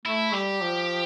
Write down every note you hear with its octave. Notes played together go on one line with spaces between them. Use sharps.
A3 E4
G3 G4
F3